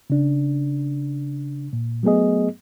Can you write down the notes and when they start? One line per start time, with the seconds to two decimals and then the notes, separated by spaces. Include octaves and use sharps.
0.10 C#3 D4
1.73 A#2
2.03 F#3 A3 B3 G#4 D#5